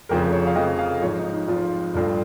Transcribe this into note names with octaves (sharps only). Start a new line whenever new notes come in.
F1 F2 C#3 F3 A#4
C#5
F5
F1 F2 C#3 F3 D#5
F5
G#1 G#2 F3 C#5
D#4
D#4
G#1 G#2 F3 F4
G1 G2 F3 F4